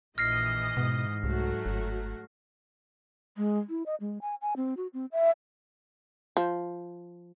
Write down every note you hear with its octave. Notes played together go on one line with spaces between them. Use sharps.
A#1 E3 D#5 F6 A#6 C7
G#2 B2
C2 F#3 A3 F#4
G1
G#3
E4
D#5
G#3
G#5
G#5
C4
F#4
C4
E5
F3